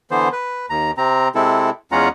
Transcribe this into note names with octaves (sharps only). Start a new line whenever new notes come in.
D3 E3 B3 C5
B4
D#2 A#5
C3 C4 A#5
C3 G#3 C4 E4 A4
E2 G#3 C#4 F4 F#5 A#5